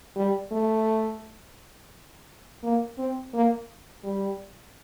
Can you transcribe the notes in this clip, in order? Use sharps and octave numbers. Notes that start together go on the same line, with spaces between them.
G3
A3
A#3
C4
A#3
G3